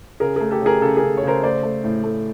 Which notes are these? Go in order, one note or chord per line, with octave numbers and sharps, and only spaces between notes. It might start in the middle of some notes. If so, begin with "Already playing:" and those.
C#3 G#4 A#4
A3 G#4 A#4
G4 A4
C#3
G#4 A#4
C#3 G4 A4
G#4 A#4
C#3
C#5
C#3 A#4 C5
A3 C5 D5
A3
A2
A3